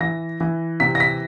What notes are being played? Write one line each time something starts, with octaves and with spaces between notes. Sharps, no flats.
E3 A#6
E3
C3 B6
A#6
B6